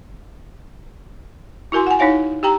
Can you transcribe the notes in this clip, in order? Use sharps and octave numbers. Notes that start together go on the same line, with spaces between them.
E4 F#4 A#4 G#5 C6
F#5 G#5
D#4 E4 C#5 F5 G#5
G4 G5 A#5